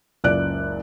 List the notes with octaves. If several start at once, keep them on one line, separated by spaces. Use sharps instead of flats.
F#1 C#2 D5 F#6 D7